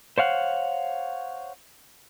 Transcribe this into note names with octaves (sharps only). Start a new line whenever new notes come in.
C5 C#5 F5 F#5